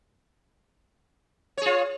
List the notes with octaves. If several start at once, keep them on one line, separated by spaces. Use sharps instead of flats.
F4 G#4 C#5